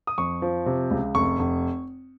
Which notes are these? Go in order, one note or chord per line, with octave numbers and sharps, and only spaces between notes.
D#6
F2 C#6
F3
C3
C#2
F1 C#6
F1